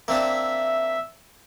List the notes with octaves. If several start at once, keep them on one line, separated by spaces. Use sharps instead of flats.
A#3 C4 D4 E5